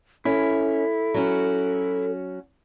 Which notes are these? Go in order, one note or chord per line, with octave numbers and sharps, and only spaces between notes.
C#4 E4 A4
F#3 C#4 F#4